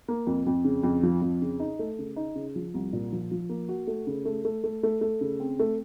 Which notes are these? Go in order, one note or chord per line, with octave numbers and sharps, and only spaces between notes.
A#3
F2
F2
C#3
F2
F3
F2
C#3
D#4
A3
C#3
D#4
C#3
F3
C2
A#2
F3
F3
A#3
F#4
A3
C#3
A3
A3
A3
A3
A3
C#3
C4
A3